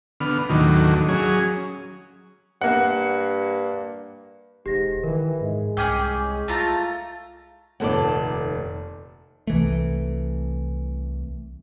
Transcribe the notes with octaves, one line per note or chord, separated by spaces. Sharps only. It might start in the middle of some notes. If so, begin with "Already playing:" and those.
D3 B3 F6
D#2 A2 D#3 F#3 D4
F#3 C#4 G#4
G2 A#3 F#5
E1 G#2 G4 A#6
D#3 E3 A#4
G#2 G#3
C2 C#4 G#4 G5 D6 F6 G6
D6
A3 F4 A#5
F1 D#2 A#2 A4 D5 F#5
C2 E3 A3